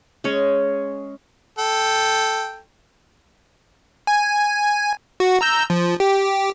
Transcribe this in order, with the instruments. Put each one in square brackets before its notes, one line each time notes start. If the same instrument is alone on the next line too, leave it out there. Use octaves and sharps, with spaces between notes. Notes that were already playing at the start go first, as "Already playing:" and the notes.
[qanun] G#3 C#4 C#5
[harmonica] A4 G5
[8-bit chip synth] G#5
F#4
A#5 E6 G6
F3
G4